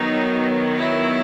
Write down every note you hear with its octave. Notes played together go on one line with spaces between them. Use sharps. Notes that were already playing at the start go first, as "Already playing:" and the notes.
Already playing: D#3 F#3 B3 D#4
E4